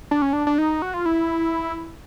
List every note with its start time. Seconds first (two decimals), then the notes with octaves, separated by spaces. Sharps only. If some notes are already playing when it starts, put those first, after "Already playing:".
0.11 D4
0.22 C#4
0.33 D4
0.47 D4
0.58 D#4
0.82 F#4
0.94 F4
1.06 E4